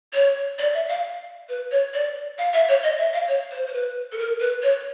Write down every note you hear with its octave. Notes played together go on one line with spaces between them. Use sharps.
C#5
D5
E5
F5
B4
C#5
D5
F5
E5
C#5
D#5
E5
F5
C#5
C5
C5
B4
A4
A#4
B4
C#5